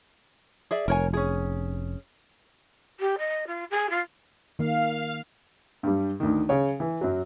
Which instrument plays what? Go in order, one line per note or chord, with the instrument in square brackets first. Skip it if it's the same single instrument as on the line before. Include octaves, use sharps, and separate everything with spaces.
[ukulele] G#4 D5 E5
[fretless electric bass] F1 [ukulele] A#4 C#5 G#5
[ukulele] C#4 G#4
[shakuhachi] G4
D#5
F4
G#4
F4
[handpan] D#3 A#3 [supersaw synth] F5
[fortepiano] G2 G3
D2 D#3
C#3 C#5
E3
F#2 F#3